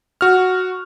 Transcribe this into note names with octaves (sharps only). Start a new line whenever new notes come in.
F#4 F6